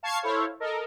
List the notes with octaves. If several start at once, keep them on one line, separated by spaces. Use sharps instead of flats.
F5 A5 C#6 G#6 C7
E4 A4 C5 C#5 F5
A4 A#4 D#5